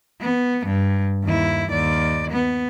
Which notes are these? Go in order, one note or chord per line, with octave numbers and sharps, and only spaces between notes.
B3
G2
D#2 E4
D#2 D5
B3